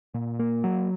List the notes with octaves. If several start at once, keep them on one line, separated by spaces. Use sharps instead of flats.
A#2
A#3
F#3